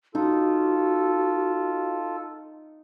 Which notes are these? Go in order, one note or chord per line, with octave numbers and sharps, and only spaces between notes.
D#4 F4 F#4 A4